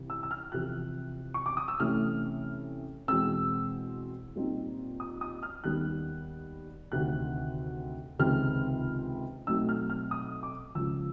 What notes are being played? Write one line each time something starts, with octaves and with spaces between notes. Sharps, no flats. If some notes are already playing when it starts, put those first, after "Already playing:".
Already playing: C2 C3 E3
E6
E6
F6
E2 C3 F3 F#6
C#6
D6
D#6
E6
C3 E3 A3 C#4 F6
E2 B2 G#3 C4 E6
A#2 G3 C4 D#4
D#6
D#6
F6
D#2 D#3 G3 B3 F#6
D2 C3 D#3 F#6
C#2 C3 D#3 G#3 C4 F6
B2 F#3 A3 C4 D#4 E6
F6
F6
D#6
D6
C#2 C#3 F3 E6